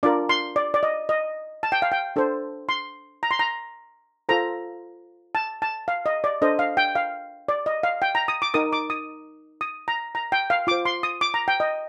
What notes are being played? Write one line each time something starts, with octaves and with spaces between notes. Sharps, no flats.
D4 F4 A#4 D5
C6
D5
D5
D#5
D#5
A5
G5
F5
G5
D4 A4 C5
C6
A#5
C6
A#5
F4 A4 C5 A#5
A5
A5
F5
D#5
D5
D4 A4 C5 D#5
F5
G5
F5
D5
D#5
F5
G5
A#5
D#6
D6
D#4 A#4 D#6
D6
D#6
D#6
A#5
A#5
G5
F5
F4 C5 D6
C6
D#6
D6
A#5
G5
D#5